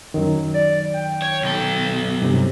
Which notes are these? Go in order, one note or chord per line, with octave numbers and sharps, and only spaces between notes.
F#2 D#3 F#3
D5
G5
C#5
B1 A4
G2 C3 E3 F#3